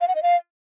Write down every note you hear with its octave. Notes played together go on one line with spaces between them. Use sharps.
F5
F#5
D#5
F5